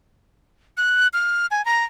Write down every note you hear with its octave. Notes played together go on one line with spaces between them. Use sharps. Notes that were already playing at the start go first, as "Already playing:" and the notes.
F#6
F6
G#5
A#5